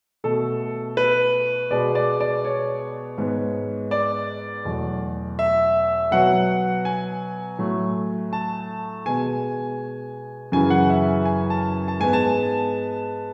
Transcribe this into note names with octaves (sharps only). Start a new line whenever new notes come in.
B2 A3 A4
B4
B2 G#3 B3 D5
D5
D5
C#5
G#2 G#3 B3
D5
E2 B2 F#3 A3
E5
B2 F#3 B3 F#5
G#5
A2 F#3 A3
A5
B2 G#3 B3 G#5
F#2 C#3 E3 G#5
F#5
E5
G#5
A5
A5
G#2 G#3 B3 G#5
A5